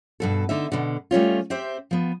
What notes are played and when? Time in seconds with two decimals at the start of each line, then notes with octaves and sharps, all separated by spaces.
0.20 G2 B2 A4
0.49 D3 D#4 E5
0.72 B2 D3
1.11 G3 A3 C#4 F4
1.50 C4 G4 C5 E5
1.91 F3 B3